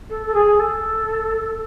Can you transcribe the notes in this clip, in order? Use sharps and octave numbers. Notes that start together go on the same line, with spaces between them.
A4
A4
G#4
A4